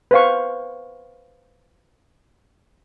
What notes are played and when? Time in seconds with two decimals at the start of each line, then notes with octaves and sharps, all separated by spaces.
0.11 B4 C5 F5 C#6